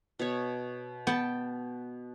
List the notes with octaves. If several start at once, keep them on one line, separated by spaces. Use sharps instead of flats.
B2 C#5
B3 G5 A5